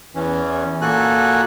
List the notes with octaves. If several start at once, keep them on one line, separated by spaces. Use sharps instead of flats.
E2 E3 C#4
A#2 A#3 F#4 A4 G#5 F#6